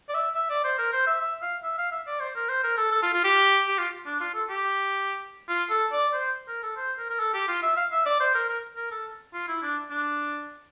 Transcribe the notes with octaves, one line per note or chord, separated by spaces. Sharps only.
D5
E5
E5
D5
C5
A#4
C5
E5
E5
F5
E5
F5
E5
D5
C5
A#4
C5
A#4
A4
A4
F4
F4
G4
G4
F4
D4
F4
A4
G4
F4
A4
D5
C5
A#4
A4
C5
A#4
A#4
A4
G4
F4
E5
F5
E5
D5
C5
A#4
A#4
A#4
A4
F4
E4
D4
D4